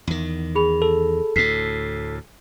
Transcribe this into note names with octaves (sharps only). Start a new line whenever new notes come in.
E2 D#3
G#4 B5 F7
A4
D2 A2 B6 C7